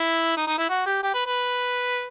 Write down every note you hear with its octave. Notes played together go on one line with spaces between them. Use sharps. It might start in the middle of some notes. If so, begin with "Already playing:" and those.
Already playing: E4
D#4
D#4
E4
F#4
G4
G4
B4
B4